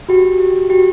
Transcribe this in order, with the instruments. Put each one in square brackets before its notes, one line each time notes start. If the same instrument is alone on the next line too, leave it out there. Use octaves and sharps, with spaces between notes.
[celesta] F#4 [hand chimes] G4
[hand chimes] G4
[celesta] F#4 [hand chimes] G4